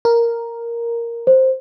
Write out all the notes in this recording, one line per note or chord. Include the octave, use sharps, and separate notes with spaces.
A#4
C5